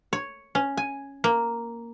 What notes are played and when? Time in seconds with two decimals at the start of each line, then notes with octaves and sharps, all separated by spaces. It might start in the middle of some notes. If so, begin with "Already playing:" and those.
0.13 C#5
0.55 C#4
0.77 G#5
1.24 A#3